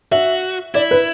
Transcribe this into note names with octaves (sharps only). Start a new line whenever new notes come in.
F#4 E5
E4 D5
B4